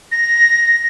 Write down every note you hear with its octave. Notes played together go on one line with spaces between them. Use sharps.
A#6